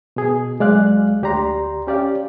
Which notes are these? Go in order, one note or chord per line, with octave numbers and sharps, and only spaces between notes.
B2 G#4
C2 F#3 G#3 D5 F5 F#6
D2 G4 D5 A#5 C6
C#4 G4 D5 F5